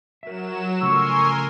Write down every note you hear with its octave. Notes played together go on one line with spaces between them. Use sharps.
F#3 A#4 E5 E7
C#3 F3 A3 A#4 G#5 C6 C#6 E6